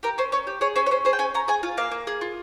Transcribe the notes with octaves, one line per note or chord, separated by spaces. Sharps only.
G4 A#4
C#4 C5
C#4 C#5
G4
G#4 C#5
C#4 C5
C#5
C#4 C5
G#4 C5
G5
C#4 G#5
C#4 A#5
G#4 G#5
F4
A#3 F5
A#3
G#4
F4